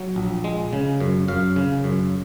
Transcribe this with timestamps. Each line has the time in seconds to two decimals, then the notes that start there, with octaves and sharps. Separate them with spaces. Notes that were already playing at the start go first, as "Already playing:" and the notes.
Already playing: F#3
0.16 A#1
0.44 G#3
0.73 C#3
1.00 F#2
1.28 F#2 F5
1.56 C#3
1.84 F#2